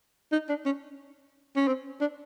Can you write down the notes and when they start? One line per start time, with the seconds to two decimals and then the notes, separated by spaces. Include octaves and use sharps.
0.32 D#4
0.49 D4
0.65 C#4
1.56 C#4
1.67 C4
2.00 D4